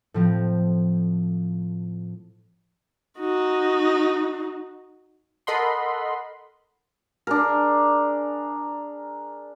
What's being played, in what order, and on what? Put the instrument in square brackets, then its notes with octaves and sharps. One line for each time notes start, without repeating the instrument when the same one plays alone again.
[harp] A2 F3 C4
[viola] D#4 F#4
[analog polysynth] A4 A#4 D#5 F#5 B5 C6
[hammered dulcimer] D4 G#4 A#4